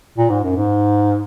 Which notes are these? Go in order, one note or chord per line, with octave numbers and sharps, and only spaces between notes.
A#2
G#2
F#2
G#2